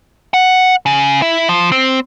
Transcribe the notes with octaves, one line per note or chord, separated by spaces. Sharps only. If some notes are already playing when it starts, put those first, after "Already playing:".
F#5
C#3
E4
F3
C4